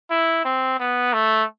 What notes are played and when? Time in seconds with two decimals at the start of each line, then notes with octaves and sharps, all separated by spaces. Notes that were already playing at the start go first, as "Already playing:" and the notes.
0.10 E4
0.45 C4
0.79 B3
1.13 A3